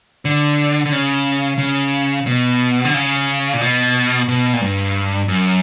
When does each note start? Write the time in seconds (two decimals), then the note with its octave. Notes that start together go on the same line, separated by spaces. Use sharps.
0.25 D3
0.86 D3
0.92 C#3
1.58 C#3
2.27 B2
2.85 D3
2.94 C#3
3.53 A#2
3.61 B2
4.28 B2
4.53 A#2
4.61 G2
5.28 F#2